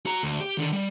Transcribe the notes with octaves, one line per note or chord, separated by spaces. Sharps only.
F#4 A#5
D2
G4
D3 D#3
G3